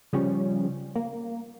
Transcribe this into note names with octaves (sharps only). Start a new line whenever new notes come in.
C#3 F3 G3 C#4
A#3